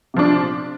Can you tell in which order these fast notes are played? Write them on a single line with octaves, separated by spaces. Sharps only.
C3 F3 D4